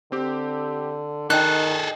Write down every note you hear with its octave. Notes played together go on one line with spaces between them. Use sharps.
D3 C4 G4
D#3 D4 G#4 A4 D#5 G5 F#6